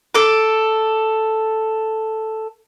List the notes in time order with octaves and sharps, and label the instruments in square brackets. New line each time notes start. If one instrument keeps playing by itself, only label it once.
[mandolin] A4 D6